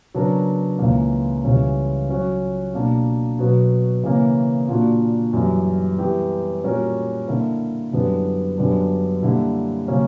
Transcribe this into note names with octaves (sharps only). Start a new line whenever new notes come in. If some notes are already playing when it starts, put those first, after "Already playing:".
C#3 F#3 B3 D4 A#4
C#2 C#3 E3 A#3
C#2 C#3 E3 G3 C#4
F#3 C#4 F#4
B2 A#3 D4
B2 F#3 B3 F#4
C#3 E3 A#3 C#4
A#2 A#3 D4 F#4
F#2 E3 G3
E3 G3 B3 E4 G4
A#2 G3 C#4 F#4 A#4
D3 A#3 E4 A#4
F#2 D3 G3 B3 E4
F#2 D3 G3 B3 D4
D3 G3 A#3 E4
C#3 F#3 A#3 C#4